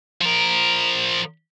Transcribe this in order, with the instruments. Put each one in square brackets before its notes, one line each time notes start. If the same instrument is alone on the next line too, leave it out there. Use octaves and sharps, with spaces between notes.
[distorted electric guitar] F3 A#4